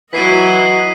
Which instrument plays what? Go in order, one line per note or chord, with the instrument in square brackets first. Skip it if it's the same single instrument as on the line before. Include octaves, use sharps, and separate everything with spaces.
[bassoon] E3 [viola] F#3 E4 [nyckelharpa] D#5 F#5 [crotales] B6 C7 D#7